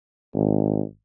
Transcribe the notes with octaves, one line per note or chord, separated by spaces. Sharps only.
G#1